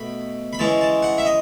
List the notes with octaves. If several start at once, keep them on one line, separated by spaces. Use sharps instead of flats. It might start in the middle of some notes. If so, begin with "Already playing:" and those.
Already playing: B2 A3 B5
B5
E3 G#3 C#4 A5
A5
F#5
E5
D#5